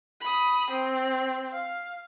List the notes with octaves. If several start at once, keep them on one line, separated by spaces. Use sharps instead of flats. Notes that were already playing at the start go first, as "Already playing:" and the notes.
B5 D#6
C4
F5